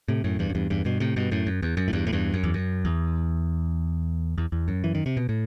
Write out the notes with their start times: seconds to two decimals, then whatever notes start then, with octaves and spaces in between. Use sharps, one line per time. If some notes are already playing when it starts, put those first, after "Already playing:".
0.08 A2 C3
0.24 F#2 A2
0.39 E2 G2
0.50 F#2
0.55 E2 G2
0.70 E2 G2
0.85 G2 B2
1.00 A2 C3
1.16 G2 B2
1.31 F#2 A2
1.47 F#2
1.62 E2
1.77 F#2
1.88 A2
1.93 E2 G2
2.07 A2
2.13 E2 G2
2.34 F#2
2.43 E2
2.54 F#2
2.85 E2
4.38 E2
4.52 E2
4.68 F#2
4.84 E3
4.95 D#3
5.06 C3
5.17 B2
5.29 A2